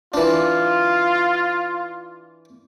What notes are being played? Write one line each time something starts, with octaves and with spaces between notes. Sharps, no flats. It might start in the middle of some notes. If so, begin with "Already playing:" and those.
E3 D4 F4